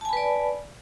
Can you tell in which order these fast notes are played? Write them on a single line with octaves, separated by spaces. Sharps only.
A5 G#5 B5 B4 D5